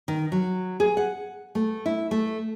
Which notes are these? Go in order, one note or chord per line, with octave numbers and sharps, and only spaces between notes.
D#3
F#3
G#4
F#5
A3
E4
A3